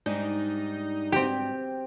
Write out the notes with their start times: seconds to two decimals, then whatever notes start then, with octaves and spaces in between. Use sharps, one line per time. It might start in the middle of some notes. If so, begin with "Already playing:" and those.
0.06 G#2 G3 D4 D#4
1.12 C4 G4